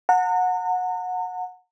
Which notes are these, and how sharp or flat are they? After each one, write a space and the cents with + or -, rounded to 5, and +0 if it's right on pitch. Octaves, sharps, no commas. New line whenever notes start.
F#5 -20 A#5 -40